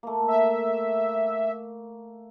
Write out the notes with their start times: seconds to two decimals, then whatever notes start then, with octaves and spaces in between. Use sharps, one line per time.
0.03 A3 A#3
0.28 E5